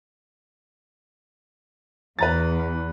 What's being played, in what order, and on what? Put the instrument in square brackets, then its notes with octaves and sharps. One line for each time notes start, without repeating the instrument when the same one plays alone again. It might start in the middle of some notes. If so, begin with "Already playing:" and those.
[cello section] E2 [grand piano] B4 A#5 A6